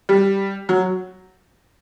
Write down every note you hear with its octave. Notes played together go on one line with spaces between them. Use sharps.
G3
F#3